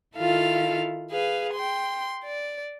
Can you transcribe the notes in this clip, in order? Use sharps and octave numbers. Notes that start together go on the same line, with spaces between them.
D#3 E4 F4 A4 F5
G#4 B4 F5
G5 C6
D5